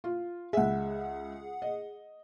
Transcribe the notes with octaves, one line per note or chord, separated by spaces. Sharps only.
F4
C#2 G#4 E5 F#5
D#5